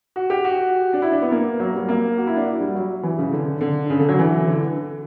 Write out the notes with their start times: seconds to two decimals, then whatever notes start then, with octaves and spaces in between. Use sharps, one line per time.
0.16 F#4
0.30 G4
0.45 F#4
0.93 D4
1.02 E4
1.12 D4
1.22 B3
1.32 A#3
1.60 F#3
1.75 G3
1.89 A#3
2.17 F#4
2.27 E4
2.36 D4
2.46 F#4
2.60 G3
2.75 F#3
3.03 E3
3.18 C#3
3.32 D3
3.61 D3
3.90 C#3
4.00 D3
4.09 F#3
4.19 E3
4.47 D3